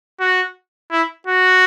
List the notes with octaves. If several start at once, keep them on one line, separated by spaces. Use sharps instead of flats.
F#4
E4
F#4